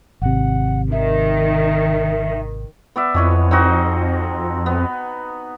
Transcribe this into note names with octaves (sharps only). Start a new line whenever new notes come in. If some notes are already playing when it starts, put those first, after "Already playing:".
G#1 C3 F#5
D#3 E5
B3 D5 E5
F2 E3 C#5 D#5
C4 D#4 F#4
B3